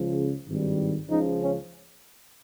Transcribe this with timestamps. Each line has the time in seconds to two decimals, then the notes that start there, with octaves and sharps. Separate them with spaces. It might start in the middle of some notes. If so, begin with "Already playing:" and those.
Already playing: C#2 C#3 F3
0.47 G#1 G2 D#3 G3
1.09 C#2 C#3 F3 D#4
1.40 C#4